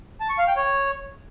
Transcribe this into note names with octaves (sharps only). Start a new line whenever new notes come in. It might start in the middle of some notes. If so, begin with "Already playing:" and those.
A5
C#6
F5
G5
C#5